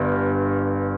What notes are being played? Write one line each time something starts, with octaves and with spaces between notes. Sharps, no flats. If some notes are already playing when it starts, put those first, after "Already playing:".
Already playing: G1 G2